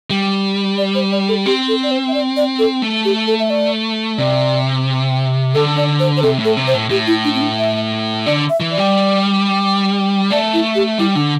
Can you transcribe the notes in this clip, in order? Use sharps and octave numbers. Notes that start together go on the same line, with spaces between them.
G3
D5
C5
D5
A4
C4 G4
A4
D5
C5
E5
D5
D5
A4
A3
G4
A4
E5
D5
C3 D5
D3 A4
D5
C5
C5
C3 A4
A2
A4
C3
C5
A2
A2 G4
E4
D4
C4
D4
E5
D3 D5
E5
E3
D5
G3
A3 D5
E4
G4
G3 E4
D3 D4